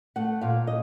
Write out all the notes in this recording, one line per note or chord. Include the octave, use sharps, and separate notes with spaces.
A3 F#5
A#2 F5
D#5